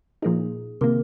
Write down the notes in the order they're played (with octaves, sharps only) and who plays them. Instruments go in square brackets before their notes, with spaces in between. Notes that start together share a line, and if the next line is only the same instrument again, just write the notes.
[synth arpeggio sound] A#2 F3 A#3 D#4 [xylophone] G#4
[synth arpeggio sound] C3 D#3 A#3 [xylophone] A#4